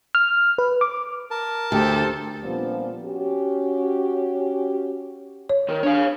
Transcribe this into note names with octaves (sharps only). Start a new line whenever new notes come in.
F6
B4
D6
A#4 A5
D2 G4 A4 C5
A#2 F3 G3 B3 C4 D4
C#4 F#4 G4
C#5
D#3
D4 C#5 F5